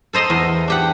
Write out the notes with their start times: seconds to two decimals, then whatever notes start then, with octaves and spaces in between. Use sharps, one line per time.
0.13 A4 C5 D#5 A#5 C6
0.30 E2
0.68 D4 G4 F#5